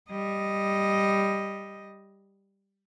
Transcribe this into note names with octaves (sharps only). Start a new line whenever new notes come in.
G3 D#5